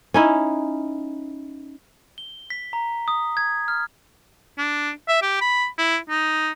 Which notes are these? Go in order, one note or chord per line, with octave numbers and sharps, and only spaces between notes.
C#4 D#4 E4
G7
B6
A#5
D#6
G#6
F6
D4
E5
G4
B5
E4
D#4